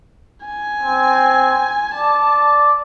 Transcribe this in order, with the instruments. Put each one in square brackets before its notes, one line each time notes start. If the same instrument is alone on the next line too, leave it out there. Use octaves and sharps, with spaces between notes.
[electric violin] G#5
[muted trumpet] C4
[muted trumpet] D5 [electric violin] A5